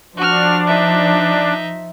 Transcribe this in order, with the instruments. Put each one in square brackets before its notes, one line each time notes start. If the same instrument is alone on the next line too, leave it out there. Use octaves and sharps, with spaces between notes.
[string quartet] F3 [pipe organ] D4 [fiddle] F#4 F6
[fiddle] D#4 E5